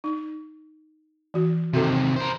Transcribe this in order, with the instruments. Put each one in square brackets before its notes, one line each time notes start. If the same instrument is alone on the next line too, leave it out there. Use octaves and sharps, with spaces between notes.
[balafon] D#4
E3 F#4
[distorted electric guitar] C3 D#3 [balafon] F#4 A4
[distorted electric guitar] A#4 C5